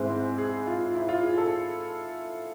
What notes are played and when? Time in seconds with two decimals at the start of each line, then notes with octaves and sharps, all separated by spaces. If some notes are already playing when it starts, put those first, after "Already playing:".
Already playing: G#2 G#3 C4 E4
0.38 G#4
0.67 F4
0.95 E4
1.09 F4
1.23 G#4
1.38 A4